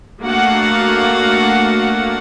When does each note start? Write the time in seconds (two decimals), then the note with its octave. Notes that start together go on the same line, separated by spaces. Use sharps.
0.21 A3 A#3 D4 F#4 F5 F#5